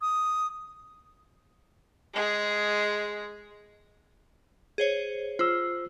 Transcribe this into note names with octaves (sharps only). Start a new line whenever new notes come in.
D#6
G#3 G#4
G#4 C5 C#5
F4 C5 E6